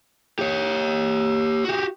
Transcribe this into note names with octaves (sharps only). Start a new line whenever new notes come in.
G4 C#5
F#4 G4